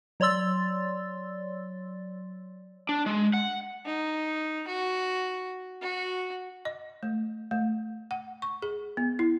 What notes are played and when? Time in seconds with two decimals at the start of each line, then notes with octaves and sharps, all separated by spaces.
0.20 F#3 C#5 D5 C6 E6 A6
2.89 D4
3.06 G#3
3.34 F#5
3.86 D#4
4.67 F#4
5.81 F#4
6.65 D#5
7.03 A3
7.51 A3
8.11 F#5
8.42 C#6
8.62 G#4
8.97 B3
9.19 E4